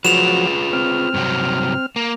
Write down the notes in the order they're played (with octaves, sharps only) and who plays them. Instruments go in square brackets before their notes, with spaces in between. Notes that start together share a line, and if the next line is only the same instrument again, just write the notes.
[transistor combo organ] F3 F#3 F#4 [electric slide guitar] F4 G#4 B4 [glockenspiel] E7 F7
[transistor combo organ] C4 F6
[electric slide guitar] G2 C3 F#3
A#3